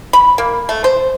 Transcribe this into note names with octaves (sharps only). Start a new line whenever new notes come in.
B5
A#3
A3
C5